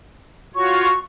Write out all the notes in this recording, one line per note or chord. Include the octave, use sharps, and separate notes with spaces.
F4 F#4 C#5 C#6